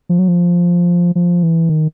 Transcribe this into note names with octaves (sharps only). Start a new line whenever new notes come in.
F3
F#3
F3
F3
E3
D#3